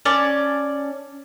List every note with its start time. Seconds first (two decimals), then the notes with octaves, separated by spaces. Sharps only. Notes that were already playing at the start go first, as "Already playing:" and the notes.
0.05 C#4 D5 A5